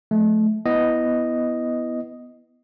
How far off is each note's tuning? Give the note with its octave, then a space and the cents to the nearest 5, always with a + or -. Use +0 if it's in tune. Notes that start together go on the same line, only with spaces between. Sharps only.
F3 +30 A3 -25
B3 +0 E4 +0 D#5 +0